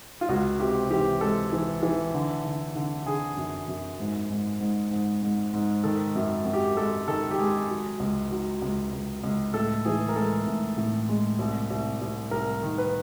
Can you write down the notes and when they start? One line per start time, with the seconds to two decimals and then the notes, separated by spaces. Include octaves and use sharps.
0.21 F4
0.29 C#2 F#4
0.60 C3 G4
0.90 E3 G4
1.21 G#3 A4
1.53 E3
1.83 E3
2.14 D3
2.45 D3
2.76 D3
3.06 D3 G#4
3.37 F#2
3.68 F#2
4.00 G#2
4.30 G#2
4.60 G#2
4.91 G#2
5.23 G#2
5.53 G#2
5.84 D#3 A4
6.16 F#2
6.45 F#2
6.53 G4
6.77 G#3 A4
7.07 D#3 A4
7.31 G4
7.38 G#3 G#4
7.69 F#3
8.00 C#2
8.31 F#3
8.62 C#2
8.93 C#2
9.24 C#2
9.54 A2 A4
9.85 E3 G#4
10.09 A#4
10.16 G#3 A4
10.47 A2
10.77 A2
11.09 G#3
11.39 C2
11.71 C2
12.02 C2
12.31 C2 A#4
12.63 D#3
12.78 B4